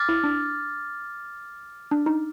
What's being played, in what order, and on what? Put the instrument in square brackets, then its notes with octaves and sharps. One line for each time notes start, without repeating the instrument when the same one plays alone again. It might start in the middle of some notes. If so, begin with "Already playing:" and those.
Already playing: [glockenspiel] D6 F6 A6
[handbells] E4
D4
D4
D#4